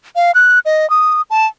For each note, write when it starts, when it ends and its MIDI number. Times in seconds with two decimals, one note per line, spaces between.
0.16 0.31 77
0.35 0.59 90
0.65 0.89 75
0.90 1.22 87
1.30 1.47 81